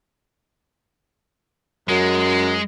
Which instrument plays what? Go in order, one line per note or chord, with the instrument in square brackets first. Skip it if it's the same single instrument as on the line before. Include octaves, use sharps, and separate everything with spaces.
[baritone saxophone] F#2 [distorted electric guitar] G#3